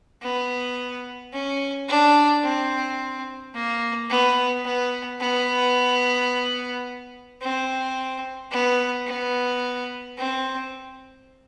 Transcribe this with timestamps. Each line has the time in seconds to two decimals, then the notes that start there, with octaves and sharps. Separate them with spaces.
0.22 B3
1.33 C#4
1.88 D4
2.43 C4
3.54 A#3
4.10 B3
4.65 B3
5.20 B3
7.42 C4
8.51 B3
9.07 B3
10.17 C4